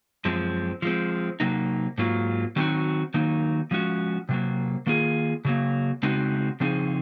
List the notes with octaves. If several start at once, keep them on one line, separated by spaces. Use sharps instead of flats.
F#2 F3 G#3 C4
F3 G#3 C4
C3 F#3 A#3 D#4
G#2 F#3 A#3 F4
D#3 F#3 C4 D#4 F#4
D#3 F#3 A#3 D#4
F3 G#3 C#4 F#4
C3 F#3 A#3
D#3 A#3 F4 G#4
C#3 F#3 A#3
C#3 G#3 C4 D#4 F#4
C#3 F3 C4 D#4 G#4